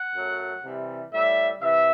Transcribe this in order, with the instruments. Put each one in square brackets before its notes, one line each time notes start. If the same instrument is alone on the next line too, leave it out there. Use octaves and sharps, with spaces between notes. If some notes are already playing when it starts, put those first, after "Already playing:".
Already playing: [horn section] F#5
F#2 F#3 A3
C3 E3 G3
A2 G3 E5
C3 E3 E5